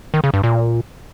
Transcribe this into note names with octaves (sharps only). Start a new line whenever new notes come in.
D#3
C#3
G2
A#2